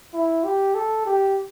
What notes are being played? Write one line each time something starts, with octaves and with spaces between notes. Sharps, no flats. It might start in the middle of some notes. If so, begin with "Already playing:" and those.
E4
G4
A4
G4